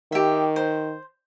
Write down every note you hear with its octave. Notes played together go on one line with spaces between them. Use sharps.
D#3 G4 E5
C5